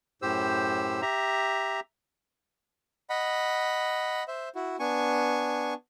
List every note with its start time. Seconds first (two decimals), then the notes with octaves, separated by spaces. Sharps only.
0.22 F#2 A2 G4 C5 E6
1.02 G4 E5 A#5
3.10 D#5 F#5 B5
4.28 C5 E5
4.55 E4 F#4
4.80 B3 D4 G#5 C#6